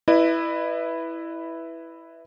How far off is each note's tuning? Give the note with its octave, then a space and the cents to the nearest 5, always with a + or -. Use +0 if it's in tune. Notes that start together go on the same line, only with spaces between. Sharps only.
E4 +0 B4 +0 D#5 -45